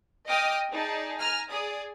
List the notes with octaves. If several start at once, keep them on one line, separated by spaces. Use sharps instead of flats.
D#5 G5 D6 D#6 F6
D#4 G#4 D5 A5
G#5 A#5 F6
G#4 D5 D#6